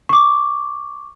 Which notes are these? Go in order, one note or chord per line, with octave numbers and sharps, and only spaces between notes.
C#6 D6